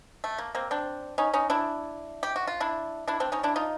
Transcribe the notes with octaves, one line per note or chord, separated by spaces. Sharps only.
A3
A#3
A#3 C4
C4 D4
C#4 D#4
C#4 D#4
D4 E4
G4
F#4
F4
D4 E4
D4 E4
C4 D4
C#4 D#4
D4 E4
D#4 F4